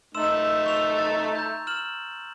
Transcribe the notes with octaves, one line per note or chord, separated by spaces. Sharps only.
A3 D#4 C6 E6 E7
C#6 F7
A6
A#5 G6
F6 E7 F#7